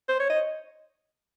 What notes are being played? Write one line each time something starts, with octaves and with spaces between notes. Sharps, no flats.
C5
C#5
D#5